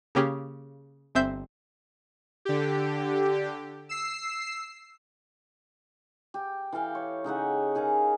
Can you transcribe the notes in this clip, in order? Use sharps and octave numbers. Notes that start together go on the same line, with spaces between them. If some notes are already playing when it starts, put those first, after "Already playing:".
C#3 A#3 C#4 G4 G#4
G1 C4 E5 G6
D3 G4
E6 C7
G4
E3 A4 F5 G5
C#5
C#3 D#4 E5 F#5
D#4 G#4 A#4 F5